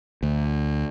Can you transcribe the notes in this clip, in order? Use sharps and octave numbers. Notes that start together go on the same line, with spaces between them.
D2